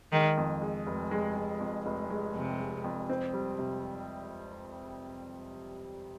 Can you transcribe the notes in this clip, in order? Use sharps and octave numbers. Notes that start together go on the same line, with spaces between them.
D#3 G#3
F2
G#3
F1
G#3
G#3
F2
F1
G#3
F2 C3
G#3
F2
C4
G3
C3